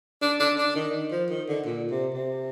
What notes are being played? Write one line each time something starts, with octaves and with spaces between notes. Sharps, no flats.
D4
D4
D4
D#3
F3
D#3
D3
A#2
C3
C3